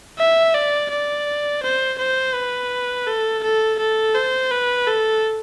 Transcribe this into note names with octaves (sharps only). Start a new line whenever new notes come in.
E5
D5
D5
C5
C5
B4
A4
A4
A4
C5
B4
A4